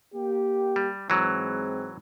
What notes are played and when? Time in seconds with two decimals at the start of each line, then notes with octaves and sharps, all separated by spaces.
0.15 A#3 G4
0.76 G3
1.10 G#2 E3 F#3 G#3 C4